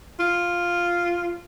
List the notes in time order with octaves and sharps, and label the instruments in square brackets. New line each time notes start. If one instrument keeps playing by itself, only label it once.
[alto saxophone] F4